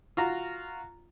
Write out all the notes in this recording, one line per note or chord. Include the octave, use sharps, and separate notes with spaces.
F4 F#4 A#5